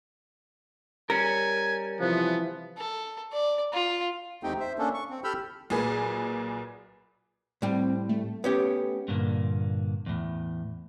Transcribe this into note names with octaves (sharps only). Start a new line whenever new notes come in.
G3 C#4 A#4 G#5
C3 E3 F3 B3
A4
D5
F4
E2 A3 C4 D#4 G4 G5
C5 E5
A#3 C#4 D4 A4
C#6
C4
G4 A4 B5 E6 F6 G6
B1 A#2 G#4 B4
A2 G3 C4
A3
B3 C#4 G4
G2 A#2 D3 A#3
E2 A2